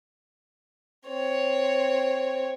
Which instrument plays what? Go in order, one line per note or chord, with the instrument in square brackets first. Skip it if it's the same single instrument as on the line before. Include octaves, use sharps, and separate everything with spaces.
[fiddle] C4 C#5